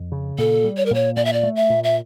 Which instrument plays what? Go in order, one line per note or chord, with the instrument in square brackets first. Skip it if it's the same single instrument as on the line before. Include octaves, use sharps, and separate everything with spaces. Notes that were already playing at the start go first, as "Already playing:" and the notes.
Already playing: [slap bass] F2
C#3
[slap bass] A#2 [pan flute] A4
[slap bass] G3
[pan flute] C#5
A#4
[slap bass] A#2 [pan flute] C#5
[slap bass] A#2 [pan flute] D5
[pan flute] E5
D5
[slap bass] A3
[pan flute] E5
[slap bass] A#2
[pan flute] E5